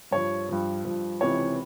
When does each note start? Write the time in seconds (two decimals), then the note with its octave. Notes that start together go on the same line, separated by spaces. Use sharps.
0.11 G2 F3 C#5
0.49 G2 F3
0.84 G2 F3
1.21 C#2 C3 E3 C#5